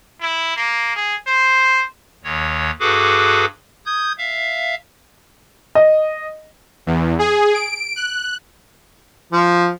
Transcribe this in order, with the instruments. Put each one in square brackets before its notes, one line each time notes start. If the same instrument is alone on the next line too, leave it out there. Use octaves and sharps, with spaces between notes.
[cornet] E4
A#3
G#4
C5
[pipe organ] D#2 D#3 C#5
G2 F#4 G#4 A4 B4 D6
D#6 G6 G#6
E5 F5
[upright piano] D#5
[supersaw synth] E2
G#4
D7
F#6
[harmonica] F3